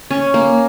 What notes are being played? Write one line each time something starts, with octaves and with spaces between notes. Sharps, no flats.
C#4
A#3